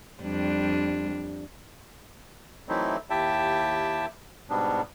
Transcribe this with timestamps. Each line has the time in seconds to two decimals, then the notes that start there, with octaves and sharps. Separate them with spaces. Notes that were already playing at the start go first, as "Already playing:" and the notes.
0.23 F2 G3 D4
2.69 E3 F#3 A3 C4 D#4 E4
3.10 D#2 E4 G4 E5 G5 A5
4.50 G#2 B2 G3 B3 D4